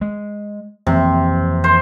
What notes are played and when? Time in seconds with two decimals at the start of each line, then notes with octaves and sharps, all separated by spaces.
0.01 G#3
0.87 F2 C3 E3 A#3
1.64 C5